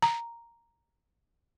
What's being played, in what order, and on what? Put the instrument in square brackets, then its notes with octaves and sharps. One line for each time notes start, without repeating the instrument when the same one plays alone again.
[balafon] A#5